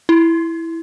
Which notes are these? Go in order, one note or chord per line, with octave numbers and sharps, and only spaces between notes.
E4